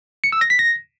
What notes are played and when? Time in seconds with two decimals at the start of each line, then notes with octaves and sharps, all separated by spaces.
0.24 C#7
0.32 E6
0.41 A#6
0.50 B6
0.59 A#6